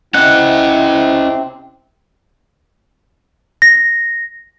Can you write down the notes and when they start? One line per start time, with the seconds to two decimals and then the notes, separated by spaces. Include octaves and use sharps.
0.14 C3 C4 C#4 E4 D#5 F#5
3.62 A#6